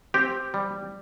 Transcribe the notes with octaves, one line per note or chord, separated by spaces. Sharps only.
C4 G4
G3